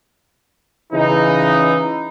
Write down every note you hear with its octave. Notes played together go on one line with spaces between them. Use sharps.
C#3 E3 D#4